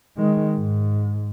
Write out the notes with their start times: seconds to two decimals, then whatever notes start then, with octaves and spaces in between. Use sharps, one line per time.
0.17 D#3 G#3
0.57 G#2